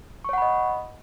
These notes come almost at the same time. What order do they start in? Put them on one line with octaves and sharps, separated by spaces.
C#6 C#5 F#5 B5 D#5